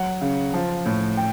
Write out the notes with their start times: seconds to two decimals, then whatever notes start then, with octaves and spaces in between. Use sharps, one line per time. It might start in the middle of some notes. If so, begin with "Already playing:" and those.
Already playing: F#3 F#5
0.21 C#3
0.54 F3
0.86 A2
1.17 G5